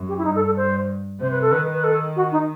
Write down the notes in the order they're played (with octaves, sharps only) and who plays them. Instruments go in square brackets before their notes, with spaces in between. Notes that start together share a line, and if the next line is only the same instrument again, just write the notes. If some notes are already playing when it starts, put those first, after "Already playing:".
Already playing: [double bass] F#2
[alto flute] G4
E4
[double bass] G2 [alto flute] D#4
[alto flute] A4
A4
C5
[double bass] C3 [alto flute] C5
[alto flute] B4
A4
[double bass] D#3 [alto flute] B4
[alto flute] B4
A4
F#4
D#4